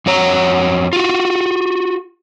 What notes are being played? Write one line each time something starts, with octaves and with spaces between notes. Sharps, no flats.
F2 F#4 C#5 A#5
F4 F#4